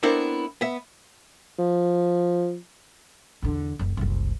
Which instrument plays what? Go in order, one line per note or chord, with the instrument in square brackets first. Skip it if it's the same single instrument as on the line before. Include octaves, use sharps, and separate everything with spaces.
[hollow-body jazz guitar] B3 C4 D4 E4 A4 A#4
B3 E5
[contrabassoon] F3
[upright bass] E2 D3
F#1 C#2
F#1 C2